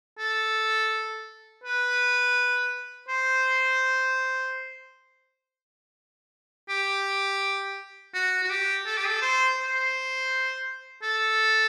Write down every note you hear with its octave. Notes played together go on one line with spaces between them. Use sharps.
A4
B4
C5
G4
F#4
F#4
G4
A4
G4
A4
C5
C5
A4